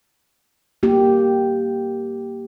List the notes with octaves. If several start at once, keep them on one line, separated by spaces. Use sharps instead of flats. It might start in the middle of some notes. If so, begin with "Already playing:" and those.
A#3 G4